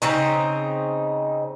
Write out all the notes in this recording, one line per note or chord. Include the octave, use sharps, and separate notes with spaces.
C#3 C4 D#4